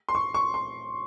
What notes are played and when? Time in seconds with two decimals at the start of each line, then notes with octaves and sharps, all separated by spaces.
0.09 C6
0.15 C#6
0.34 C#6
0.54 C6